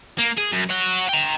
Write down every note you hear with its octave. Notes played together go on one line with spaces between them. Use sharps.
A#3
G#4
F#2
C#5 F#5
G5 A#5